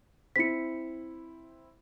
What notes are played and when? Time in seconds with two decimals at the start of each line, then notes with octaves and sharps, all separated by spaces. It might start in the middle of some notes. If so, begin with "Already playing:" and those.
0.36 C4 E4 B6 C#7